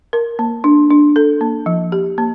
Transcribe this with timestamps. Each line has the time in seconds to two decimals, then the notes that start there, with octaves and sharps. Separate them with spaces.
0.13 A#4
0.39 A#3
0.64 D4
0.90 D4
1.16 A4
1.41 A#3
1.66 F3
1.92 G4
2.18 A#3